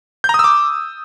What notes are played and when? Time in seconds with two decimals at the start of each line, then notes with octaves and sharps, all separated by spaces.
0.24 G6
0.29 A#5
0.34 D#6
0.39 E6
0.44 D6